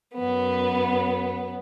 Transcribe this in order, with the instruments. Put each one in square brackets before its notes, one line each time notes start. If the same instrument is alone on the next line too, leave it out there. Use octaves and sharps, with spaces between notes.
[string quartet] F#2 B3